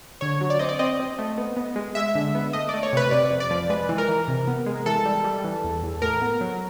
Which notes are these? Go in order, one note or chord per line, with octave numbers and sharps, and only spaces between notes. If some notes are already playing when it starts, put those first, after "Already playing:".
D3 C#5
F#3
D5
C4 D#5
D5
C4 D#5
C4
A3
B3
B3
G#3
G#3 E5
D3
B3
A3 D#5
A3 D5
C#5
C3 B4
C3 D5
F2
D5
F3
G#3 B4
E3
A#4
E3
C3
B3
G#3
E3 A4
G3
G3
E3
E2
E2
A2 A#4
B3
F#3